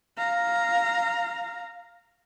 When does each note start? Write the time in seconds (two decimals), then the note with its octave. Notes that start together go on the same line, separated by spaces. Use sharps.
0.18 F5 A#5